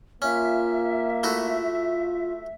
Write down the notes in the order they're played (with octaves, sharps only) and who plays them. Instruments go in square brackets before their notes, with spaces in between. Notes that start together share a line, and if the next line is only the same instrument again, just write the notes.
[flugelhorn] A#3 [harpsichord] C#4 [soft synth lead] F4 [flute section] E5
[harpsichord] A3 E4 F#4